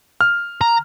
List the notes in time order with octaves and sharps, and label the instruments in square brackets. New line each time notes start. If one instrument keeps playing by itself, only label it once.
[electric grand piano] F6
[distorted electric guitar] A#5